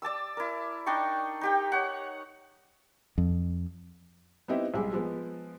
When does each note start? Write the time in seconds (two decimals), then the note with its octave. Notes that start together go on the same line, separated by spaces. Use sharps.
0.02 D5 A5 D6 E6
0.37 E4 A#4
0.86 D4 D#4 G5 C#6
1.41 D#4 G4 G5
1.72 C#5 F#5
3.18 F2
4.48 B3 C4 D#4 E4 G4
4.74 B1 G3 G#3
4.93 F3 G#3 B3